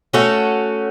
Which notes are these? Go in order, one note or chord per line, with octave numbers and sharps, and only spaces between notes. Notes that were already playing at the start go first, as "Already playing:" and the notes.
A3 C#4 F#4 A4